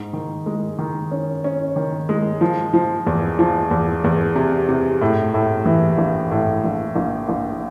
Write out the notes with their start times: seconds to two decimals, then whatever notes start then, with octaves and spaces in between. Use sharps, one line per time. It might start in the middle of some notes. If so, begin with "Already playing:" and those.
Already playing: G#2
0.13 D#3
0.46 G#3
0.79 D#3
1.11 C#4
1.44 C#4
1.76 D#3
2.09 G#3
2.41 F3
2.74 F3
3.07 E2
3.39 F3
3.71 E2
4.04 E2
4.36 C3
4.69 C3
5.01 A2
5.34 A2
5.66 E3
5.98 A#1
6.31 A2
6.64 A#1
6.96 A#1
7.29 A#1